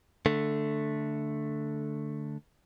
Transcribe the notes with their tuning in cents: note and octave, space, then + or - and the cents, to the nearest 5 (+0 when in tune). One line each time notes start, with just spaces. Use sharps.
D3 +0 A3 +0